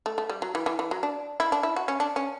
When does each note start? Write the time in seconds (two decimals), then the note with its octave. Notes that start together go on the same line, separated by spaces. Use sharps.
0.06 A3
0.18 A3
0.30 G3
0.42 F#3
0.55 E3
0.66 E3
0.79 E3
0.91 F#3
1.03 D4
1.40 E4
1.52 D4
1.63 E4
1.76 F#4
1.88 C#4
2.00 D4
2.16 C#4